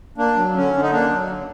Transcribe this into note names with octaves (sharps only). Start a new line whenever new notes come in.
A#3 D4
F#3
D3 C#4
D3
D#4
A#3 D4
F#3
D3